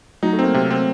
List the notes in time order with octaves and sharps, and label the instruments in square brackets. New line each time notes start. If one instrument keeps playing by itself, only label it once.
[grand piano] F#3 [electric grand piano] D#4
[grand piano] A3
[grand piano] A#3 [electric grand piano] C4
[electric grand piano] C3 [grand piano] A#3
[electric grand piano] C4